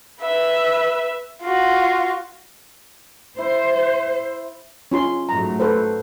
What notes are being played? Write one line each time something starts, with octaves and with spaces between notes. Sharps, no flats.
B4 E5
F4 F#4
E4 C5
C#4 F4 C6
G#2 F#3 A3 A#5
A4 B4 C5